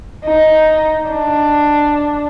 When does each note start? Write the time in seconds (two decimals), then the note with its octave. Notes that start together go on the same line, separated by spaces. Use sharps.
0.25 D#4
1.10 D4